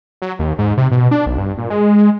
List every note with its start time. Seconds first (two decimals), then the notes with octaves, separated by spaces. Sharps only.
0.22 F#3
0.39 D#2
0.59 G#2
0.77 C3
0.91 B2
1.11 D4
1.26 B1
1.38 G2
1.58 A#2
1.70 G#3